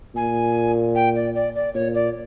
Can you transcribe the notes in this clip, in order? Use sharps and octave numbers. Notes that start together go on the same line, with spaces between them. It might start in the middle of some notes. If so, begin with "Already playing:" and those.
A#2 G#5
G5
D5
D5
D5
A#2 C#5
D5